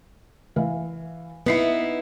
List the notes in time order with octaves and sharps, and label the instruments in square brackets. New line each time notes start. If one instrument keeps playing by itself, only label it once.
[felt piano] E3 F5
[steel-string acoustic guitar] B3 D#4 E4 [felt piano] B4 C7 C#7